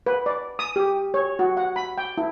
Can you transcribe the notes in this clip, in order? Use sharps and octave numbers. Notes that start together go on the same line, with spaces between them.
B4
D5
D#6
G4
C#5
F#4
F#5
B5
G5
E4